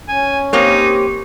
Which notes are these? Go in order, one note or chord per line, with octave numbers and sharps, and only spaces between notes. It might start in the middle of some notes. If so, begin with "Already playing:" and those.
C#4 G#5
A#3 C4 D#4 G4 C#5